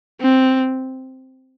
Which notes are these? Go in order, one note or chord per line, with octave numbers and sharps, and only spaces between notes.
C4